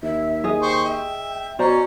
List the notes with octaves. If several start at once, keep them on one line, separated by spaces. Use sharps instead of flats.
D#2 E5
G#4 D#5
C5 G5 C#6
E5
B2 C#4 C5 D5 A#5 C#6